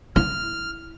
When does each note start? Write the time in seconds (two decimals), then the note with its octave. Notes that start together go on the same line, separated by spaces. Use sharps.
0.16 E4 F6